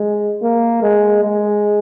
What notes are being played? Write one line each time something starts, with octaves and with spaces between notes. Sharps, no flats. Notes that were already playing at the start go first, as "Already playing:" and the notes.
Already playing: G#3
A#3
G#3
G#3